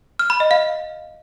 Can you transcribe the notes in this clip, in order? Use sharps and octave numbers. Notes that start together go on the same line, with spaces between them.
F6
B5
D#5
F5